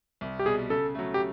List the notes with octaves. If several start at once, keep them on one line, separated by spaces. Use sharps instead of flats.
C2
G4
B2 G3 G#4
C#3 A4
F#3 A3
G4